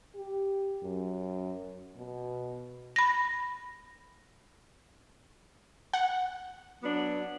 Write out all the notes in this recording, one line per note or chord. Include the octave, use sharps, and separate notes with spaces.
G4
F#2
B2
B5 A#6
F#5
F#3 B3 D4